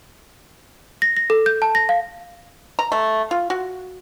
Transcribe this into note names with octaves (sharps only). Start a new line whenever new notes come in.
A#6
A#6
A4
G6
A5
A#6
F5
A#5
A3
F4
F#4